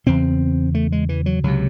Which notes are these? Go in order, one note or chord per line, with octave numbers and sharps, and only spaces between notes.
E2 C#3 C4
A3
G#3
E3
F#3
C#2 C3 F#3